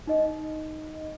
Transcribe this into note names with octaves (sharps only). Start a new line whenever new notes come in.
D#4 D#5